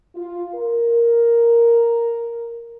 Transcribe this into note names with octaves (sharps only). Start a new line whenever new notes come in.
F4
A#4